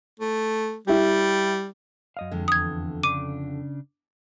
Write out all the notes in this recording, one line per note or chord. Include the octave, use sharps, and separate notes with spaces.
A3
G3 E4 G4
F#2 D#5 F5
F2 D3 G#3
E2 D#6 G#6
C#3 D4 D6 D#7